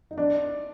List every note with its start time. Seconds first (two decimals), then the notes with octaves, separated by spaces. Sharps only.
0.11 D#4
0.18 D4